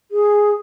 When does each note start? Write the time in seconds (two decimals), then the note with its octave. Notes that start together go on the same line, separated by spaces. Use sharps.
0.11 G#4